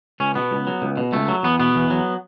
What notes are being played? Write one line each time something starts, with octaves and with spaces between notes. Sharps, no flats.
C#2 C#4
B2 B3
C#2
F#3
C#2
B2
C#2 A3
F#3
E2 B3
B2 B3
E2
F#3